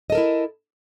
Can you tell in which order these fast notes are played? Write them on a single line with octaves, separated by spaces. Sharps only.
D#5 A4 A#4 E4